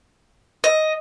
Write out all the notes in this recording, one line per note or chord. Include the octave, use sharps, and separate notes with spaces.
D#5